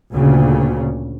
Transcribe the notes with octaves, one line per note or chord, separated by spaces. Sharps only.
D2 A#2 C#3